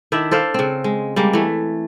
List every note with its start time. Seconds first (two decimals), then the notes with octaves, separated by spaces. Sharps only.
0.12 D#3 D4 E4 E5
0.31 A4 C5 D5 F5
0.54 C#3 C4
0.84 G#3
1.16 G3 G#3 A#3
1.33 E3 A3